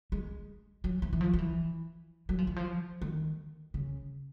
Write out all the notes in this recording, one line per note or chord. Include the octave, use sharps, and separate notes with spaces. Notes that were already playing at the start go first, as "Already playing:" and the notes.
G#3
F#3
E3
E3
F3
F3
E3
F#3
F3
E3
F3
D#3
C#3